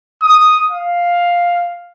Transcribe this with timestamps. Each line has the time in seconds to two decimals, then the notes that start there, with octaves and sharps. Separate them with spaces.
0.22 D#6
0.71 F5